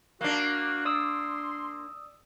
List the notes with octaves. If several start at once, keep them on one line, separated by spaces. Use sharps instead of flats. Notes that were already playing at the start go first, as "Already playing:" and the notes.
A#3 D4 F#4
D5 C6 D#6 E6